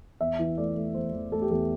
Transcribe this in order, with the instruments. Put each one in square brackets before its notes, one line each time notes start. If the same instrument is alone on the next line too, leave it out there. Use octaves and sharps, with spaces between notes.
[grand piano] E2 E5
E3
A3 D5
A3
E2 C5
E2
A3 A4
G4
E2 A4